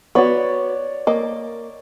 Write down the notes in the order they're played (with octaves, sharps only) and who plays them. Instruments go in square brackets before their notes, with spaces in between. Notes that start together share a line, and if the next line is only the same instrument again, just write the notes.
[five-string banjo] B3 F#4 [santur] C#5 D5
[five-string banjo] A#3 D#5 [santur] D6